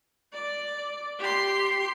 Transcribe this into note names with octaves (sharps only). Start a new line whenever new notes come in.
D5
G4 C6